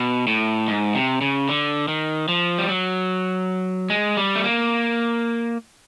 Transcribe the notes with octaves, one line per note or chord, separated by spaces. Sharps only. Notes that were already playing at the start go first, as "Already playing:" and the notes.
Already playing: B2
A2
G#2
C3
C#3
D3
D#3
F3
G3
F#3
G#3
G3
A3
A#3